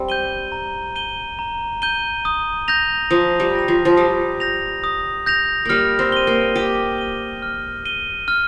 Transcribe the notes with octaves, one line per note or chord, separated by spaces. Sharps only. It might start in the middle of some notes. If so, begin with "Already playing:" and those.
Already playing: G3 C4
G6 D#7 G7
A#5
G6 D#7 G7
A#5
G6 D#7 G7
D#6
G6 A#6 F7
F3 D#6
G3
G6 A#6 F7
F3
F3
G3 D#6
G6 A#6 F7
D#6
G6 A#6 F7
G3 A#3 F6
C4
D#7 G7
A#3
G4 F6
D#7 G7
F6
D#7 G7
F6